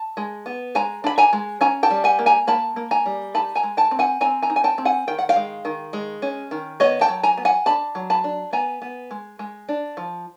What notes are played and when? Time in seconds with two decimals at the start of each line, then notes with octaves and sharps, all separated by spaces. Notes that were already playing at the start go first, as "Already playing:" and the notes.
Already playing: A5
0.17 G#3
0.46 B3
0.75 G#3 G#5 A#5
1.04 D4 B5
1.18 G#5 A#5
1.33 G#3
1.61 C#4 G#5 A#5
1.83 G5 A5
1.90 G3
2.04 F#5 G#5
2.19 A#3
2.26 G#5 A#5
2.47 A#3 A5 B5
2.76 A#3
2.91 G#5 A#5
3.06 G3
3.34 D#4 A5 B5
3.55 G#5 A#5
3.63 G#3
3.77 G5 A5
3.91 C4
3.99 F#5 G#5
4.21 C4 G#5 A#5
4.42 G#5 A#5
4.50 D#4
4.56 G#5
4.64 G5 A5
4.78 C4
4.85 F#5 G#5
5.08 D#3 G5
5.19 F#5
5.29 F5 G5
5.36 G#3
5.65 D#3
5.93 G#3
6.22 C#4
6.51 D#3
6.80 B3 C#5 D#5
7.01 G5 A5
7.09 F#3
7.23 G#5 A#5
7.37 B3
7.45 F#5 G#5
7.66 D4 A5 B5
7.95 F#3
8.10 A5 B5
8.24 D4
8.53 B3 G#5 A#5
8.82 B3
9.11 G#3
9.39 G#3
9.69 D4
9.97 F3